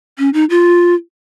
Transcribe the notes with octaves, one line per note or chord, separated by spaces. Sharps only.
C#4
D#4
F4